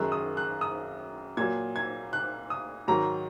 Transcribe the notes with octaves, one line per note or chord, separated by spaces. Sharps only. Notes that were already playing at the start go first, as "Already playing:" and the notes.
Already playing: F#2 D#3 G#3 F#6
D#6
F#6
D#6
A#2 F#3 G#6
G#6
F#6
D#6
G#2 D#3 F#3 A#5